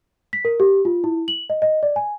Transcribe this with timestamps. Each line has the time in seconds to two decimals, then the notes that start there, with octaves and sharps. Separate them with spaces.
0.33 B6
0.45 A#4
0.60 G4
0.85 F4
1.04 E4
1.28 F#7
1.50 D#5
1.62 D#5
1.83 D5
1.96 G#5